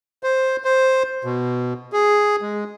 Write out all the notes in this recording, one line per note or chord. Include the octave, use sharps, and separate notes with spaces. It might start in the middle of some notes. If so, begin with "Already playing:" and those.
C5
C5
B2
G#4
G#3